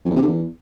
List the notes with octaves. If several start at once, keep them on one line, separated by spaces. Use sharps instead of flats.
F2
E2
C3
D3
E2